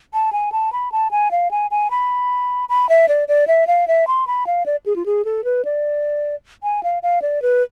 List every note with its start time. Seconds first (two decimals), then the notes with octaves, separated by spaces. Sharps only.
0.13 A5
0.33 G#5
0.52 A5
0.72 B5
0.92 A5
1.11 G#5
1.31 F5
1.51 G#5
1.71 G#5
1.91 B5
2.69 B5
2.89 E5
3.08 D5
3.28 D5
3.47 E5
3.67 F5
3.88 E5
4.07 C6
4.27 B5
4.47 F5
4.66 D5
4.86 G#4
4.96 F4
5.06 G#4
5.25 A4
5.44 B4
5.65 D5
6.63 G#5
6.83 F5
7.03 F5
7.22 D5
7.42 B4